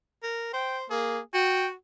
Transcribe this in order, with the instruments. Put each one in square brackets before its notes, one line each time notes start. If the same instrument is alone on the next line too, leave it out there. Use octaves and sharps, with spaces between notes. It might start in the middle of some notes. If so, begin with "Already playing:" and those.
[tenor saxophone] A#4
[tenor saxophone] C5 [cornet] G5
[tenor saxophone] A#3 [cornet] G#4
[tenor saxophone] F#4 [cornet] G5